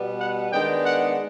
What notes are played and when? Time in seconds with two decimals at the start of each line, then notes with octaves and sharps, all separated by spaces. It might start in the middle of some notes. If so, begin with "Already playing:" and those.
Already playing: B2 G3 B3
0.20 F#5
0.52 D#3 G#3 B3 D4 G5
0.85 F#5